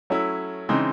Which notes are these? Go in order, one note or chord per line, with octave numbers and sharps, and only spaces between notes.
F#3 A3 C#4 E4
C#3 E3 G#3 C4 D#4